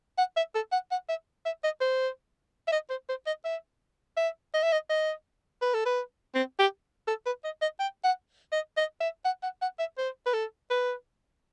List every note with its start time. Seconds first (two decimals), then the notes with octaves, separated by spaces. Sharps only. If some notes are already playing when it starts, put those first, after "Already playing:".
0.18 F#5
0.37 E5
0.55 A4
0.72 F#5
0.91 F#5
1.09 E5
1.45 E5
1.64 D#5
1.81 C5
2.68 E5
2.72 D#5
2.90 C5
3.09 C5
3.27 D#5
3.45 E5
4.17 E5
4.54 D#5
4.63 E5
4.72 D#5
4.90 D#5
5.62 B4
5.74 A4
5.86 B4
6.35 C4
6.59 G4
7.08 A4
7.26 B4
7.44 D#5
7.62 D#5
7.80 G5
8.04 F#5
8.52 D#5
8.77 D#5
9.00 E5
9.25 F#5
9.43 F#5
9.62 F#5
9.79 E5
9.98 C5
10.26 B4
10.34 A4
10.70 B4